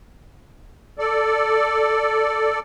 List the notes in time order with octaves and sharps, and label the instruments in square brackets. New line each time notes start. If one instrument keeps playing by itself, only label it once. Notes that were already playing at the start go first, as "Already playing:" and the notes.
[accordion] A4 D5